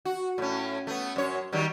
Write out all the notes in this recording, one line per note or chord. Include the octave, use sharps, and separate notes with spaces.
F#4
A2 C#4
A3 B3
F#2 C#5
D#3 F#3 G3